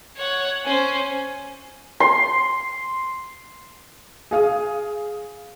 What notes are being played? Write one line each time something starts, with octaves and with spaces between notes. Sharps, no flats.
C#5 F#5
C#4 C5
C6
G#4 F5 D#6